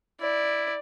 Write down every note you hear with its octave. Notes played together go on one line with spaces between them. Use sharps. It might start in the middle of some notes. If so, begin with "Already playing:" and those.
E4 D5